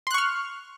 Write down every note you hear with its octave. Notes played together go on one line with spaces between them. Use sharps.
C6 C#6 F6 F#6